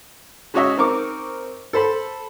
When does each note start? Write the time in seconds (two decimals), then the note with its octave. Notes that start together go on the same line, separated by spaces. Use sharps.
0.54 G#3 C#4 F#4 C#5 D#5 E5
0.78 C4 D#4 A#4 C#6 D6
1.73 A4 C5 B5